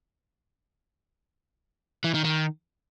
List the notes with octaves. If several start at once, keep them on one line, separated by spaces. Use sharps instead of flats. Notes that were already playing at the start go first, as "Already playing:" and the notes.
E3
D#3
D#3